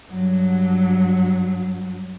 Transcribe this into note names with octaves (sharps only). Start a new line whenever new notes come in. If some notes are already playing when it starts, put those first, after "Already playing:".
G2 F#3